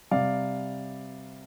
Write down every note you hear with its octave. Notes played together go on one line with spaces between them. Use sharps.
C3 G3 D5 F5